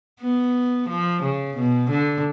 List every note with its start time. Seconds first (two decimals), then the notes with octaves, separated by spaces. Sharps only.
0.20 B3
0.89 F3
1.23 C#3
1.56 B2
1.90 D3